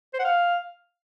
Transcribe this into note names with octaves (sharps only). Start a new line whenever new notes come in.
C5
F#5
F5